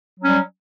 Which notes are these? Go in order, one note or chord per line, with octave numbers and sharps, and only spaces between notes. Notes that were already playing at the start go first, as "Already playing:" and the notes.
F#3 G3 C#4